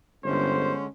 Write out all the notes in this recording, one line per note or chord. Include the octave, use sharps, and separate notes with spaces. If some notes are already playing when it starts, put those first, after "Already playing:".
G1 D3 G#3 C#4 C5